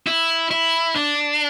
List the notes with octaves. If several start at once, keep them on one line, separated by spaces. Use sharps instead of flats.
E4
E4
D4